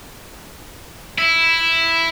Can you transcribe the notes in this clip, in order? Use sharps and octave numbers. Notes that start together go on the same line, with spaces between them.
E4